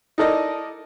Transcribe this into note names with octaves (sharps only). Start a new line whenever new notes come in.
D#4 E4 A4 A#4 D5 D#5